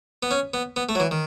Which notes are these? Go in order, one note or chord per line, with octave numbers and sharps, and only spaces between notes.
B3
C#4
B3
B3
A3
F#3
E3
D#3